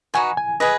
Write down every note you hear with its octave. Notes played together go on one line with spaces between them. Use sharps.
D#4 F#4 B4 G#5
G#5
G#4 B4 D#5